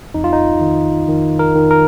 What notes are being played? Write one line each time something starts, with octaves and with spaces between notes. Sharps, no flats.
F2 D#4
F4
D#4
D#3
D#3
A#4
D#3
A#4